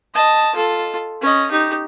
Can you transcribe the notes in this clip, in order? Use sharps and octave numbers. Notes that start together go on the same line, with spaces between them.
D#5 A5
F4 A4
C#4 D#5
D#4 G4